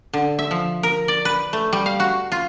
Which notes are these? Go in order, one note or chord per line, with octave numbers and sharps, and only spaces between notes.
D3
E5
F3
A#4
D5
B4
A3
G3
F5
F#4
F4